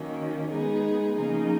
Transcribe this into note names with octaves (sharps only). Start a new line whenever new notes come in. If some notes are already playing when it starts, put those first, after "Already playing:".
Already playing: D#3 F#3 A#3 C#4
G#3 B3 D#4 G#4
C#3 F3 A#3 D#4 G#4